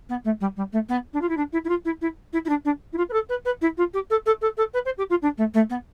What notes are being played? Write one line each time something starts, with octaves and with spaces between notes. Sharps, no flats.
B3
A3
G3
G3
A3
B3
D4
F4
E4
D4
E4
E4
F4
E4
E4
E4
E4
D4
D4
E4
F4
B4
A4
B4
B4
E4
F4
G4
A4
A4
A4
A4
B4
C5
G4
F4
D4
A3
A3
B3